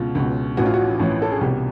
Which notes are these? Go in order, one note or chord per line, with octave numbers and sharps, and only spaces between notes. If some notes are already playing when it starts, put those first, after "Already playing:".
Already playing: C#2 B2 F4
C#2 B2
A1 A2 E3 F#4
F4
F#4
A1 A2 E3
A4
G#4
C2 B2 G4